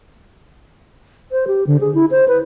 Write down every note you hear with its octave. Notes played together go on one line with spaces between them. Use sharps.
C5
G4
D3
G#4
E4
C5
B4